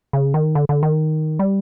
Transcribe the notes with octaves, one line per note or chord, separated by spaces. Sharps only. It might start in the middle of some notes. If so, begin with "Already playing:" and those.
C#3
D#3
D3
D3
D#3
G3